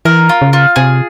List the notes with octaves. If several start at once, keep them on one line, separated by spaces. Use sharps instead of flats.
E3 A#4
F4
C#3
F4
C3 G#4